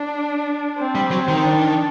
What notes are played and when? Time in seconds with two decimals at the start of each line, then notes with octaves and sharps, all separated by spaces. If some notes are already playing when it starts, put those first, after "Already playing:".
Already playing: D4
0.78 C4
0.95 G3
1.11 F#3
1.28 D#3
1.44 D4